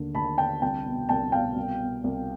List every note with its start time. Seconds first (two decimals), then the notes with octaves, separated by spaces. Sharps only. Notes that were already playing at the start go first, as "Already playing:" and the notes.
Already playing: D#2 D3
0.15 D#2 A5 B5
0.38 D3 G5 A5
0.62 C2 G5 A5
0.86 B2
1.09 C2 G5 A5
1.32 B2 F5 G5
1.56 C2
1.80 B2
2.04 C2